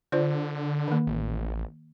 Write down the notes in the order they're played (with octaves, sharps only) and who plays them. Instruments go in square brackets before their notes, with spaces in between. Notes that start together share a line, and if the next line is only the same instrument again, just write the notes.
[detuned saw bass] D3 [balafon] F4 C5 D5
[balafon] D#3 A#3
[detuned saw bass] A1